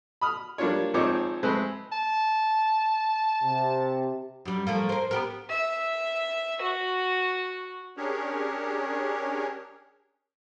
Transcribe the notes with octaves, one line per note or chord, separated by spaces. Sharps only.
B5 D#6 F6
G3 A#3 D4 F4 C#5
G#1 F3 C4 D#4 C#5 D6
G#3 A3 C4 B4
A5
C3
F#2 G3
F3 A3 A#3
A#4 C5
B3 G4 A#4
E5
F#4
C#4 D4 G4 G#4 A#4 C#5